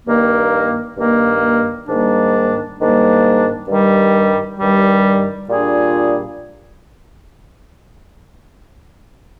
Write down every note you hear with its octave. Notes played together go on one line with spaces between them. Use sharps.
G2 D#3 A#3
G2 D#3 A#3
G#2 D#3 G3 A#3 D4
G#2 D#3 G3 A#3 D4
G2 D#3 G3
G2 D#3 G3
A#2 G3 D4 F4 G#4